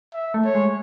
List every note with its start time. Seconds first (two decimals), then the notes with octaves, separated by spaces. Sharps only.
0.14 E5
0.34 A3
0.45 C#5
0.55 G#3